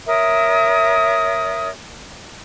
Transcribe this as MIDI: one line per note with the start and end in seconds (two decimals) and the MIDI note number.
0.07 1.70 70
0.07 1.70 73
0.07 1.70 76
0.07 1.70 87